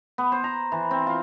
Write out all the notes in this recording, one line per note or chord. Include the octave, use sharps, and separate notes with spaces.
B3
C5
A#5
E3
C4
F4